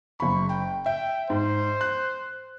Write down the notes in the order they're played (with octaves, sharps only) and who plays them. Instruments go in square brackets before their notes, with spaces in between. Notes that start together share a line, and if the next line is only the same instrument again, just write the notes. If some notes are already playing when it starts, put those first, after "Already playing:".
[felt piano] F#1 B5 [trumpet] C#6
[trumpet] G5
[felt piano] E5 [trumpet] G5
[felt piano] G#2 [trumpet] C5
[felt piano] F#6